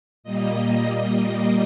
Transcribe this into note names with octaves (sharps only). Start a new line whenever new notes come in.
A#2 G3 A#3 D#5